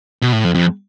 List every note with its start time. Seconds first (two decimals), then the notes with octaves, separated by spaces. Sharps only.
0.22 B2
0.33 A2
0.44 F2
0.55 F2